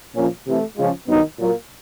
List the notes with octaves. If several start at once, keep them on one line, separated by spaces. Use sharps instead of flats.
A#2 F3 A#3 C#4
C3 E3 A3
C#3 F3 G#3 C#4 F4
G2 D#3 F#3 B3 D#4
A#2 F#3 A#3